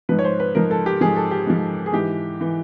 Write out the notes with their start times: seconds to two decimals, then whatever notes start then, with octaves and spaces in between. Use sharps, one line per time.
0.09 G#2 F3 B4
0.19 C#5
0.24 C5
0.40 B4
0.55 G#2 F3 A#4
0.71 A4
0.86 G4
1.01 G#2 F3 G#4
1.16 A4
1.31 G4
1.47 G#2 F3
1.86 G#4
1.93 G#2 E3 G4
2.41 E3